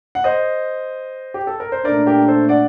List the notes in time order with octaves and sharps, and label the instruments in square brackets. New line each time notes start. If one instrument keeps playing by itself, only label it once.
[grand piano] F#5
C5 D#5
G4
A4
A#4
C5
[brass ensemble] A#2 A3 D4 [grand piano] A#4 D5
[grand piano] G4 A#4
A4 C5
D5 F#5